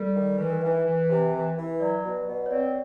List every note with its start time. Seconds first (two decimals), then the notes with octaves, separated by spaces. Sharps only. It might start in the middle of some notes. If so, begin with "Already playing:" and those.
Already playing: G3 A4 A#4
0.15 D#3
0.38 E3 B4
0.50 A#4
0.61 E3 B4
0.85 E3
1.10 C3
1.33 E3
1.57 E3
1.80 F#3 D5
2.04 B2
2.27 B2
2.46 C#5
2.50 C4 D5